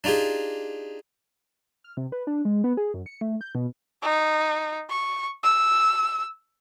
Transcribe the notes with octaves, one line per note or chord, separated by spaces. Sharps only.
D4 D#4 F4 G4 G#4
F6
C3
B4
D4
G#3
B3
G#4
F#2
C#7
A3
G6
B2
D#4
C#6
E6